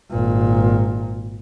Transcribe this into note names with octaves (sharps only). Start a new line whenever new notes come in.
G#1 A#2